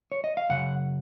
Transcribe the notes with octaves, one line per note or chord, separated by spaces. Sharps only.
C#5
D#5
F5
F#2 C#3 F#3 F#5